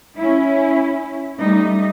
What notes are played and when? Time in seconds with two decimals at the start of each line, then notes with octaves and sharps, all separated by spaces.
0.18 C#4 E4
1.40 G3 A3 D#4